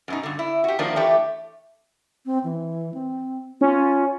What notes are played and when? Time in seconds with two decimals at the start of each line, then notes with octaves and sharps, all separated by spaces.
0.08 F#2 B2 D#4
0.23 G2 D3
0.39 E4
0.64 F#4 G4
0.79 D#3 F3 A3 A#3 D4 A#4
0.96 E3 A3 G4 C#5
2.25 C4
2.44 E3
2.94 C4
3.61 C#4 F4